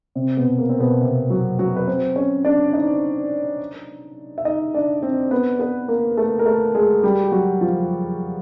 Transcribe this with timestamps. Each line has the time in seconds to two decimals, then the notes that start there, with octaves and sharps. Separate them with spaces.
0.15 C3 C4
0.37 B2 B3
0.58 A#3
0.69 C4
0.80 B2 B3
1.01 C3 C4
1.30 F#3 F#4
1.59 F#3 F#4
1.76 B4
1.87 C4 C5
2.16 C#4 C#5
2.45 D4 D5
2.73 D#4 D#5
4.38 E5
4.45 D#4 D#5
4.74 D4 D5
5.03 C4 C5
5.31 B3 B4
5.60 B3 B4
5.88 A#3 A#4
6.17 A3 A4
6.39 A#4
6.46 A3 A4
6.75 G#3 G#4
7.03 G3 G4
7.24 G4
7.32 F#3 F#4
7.61 F3 F4